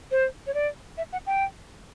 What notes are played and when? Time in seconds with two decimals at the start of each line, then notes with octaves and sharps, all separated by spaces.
0.11 C5
0.47 C#5
0.54 D5
0.98 E5
1.12 F#5
1.26 G5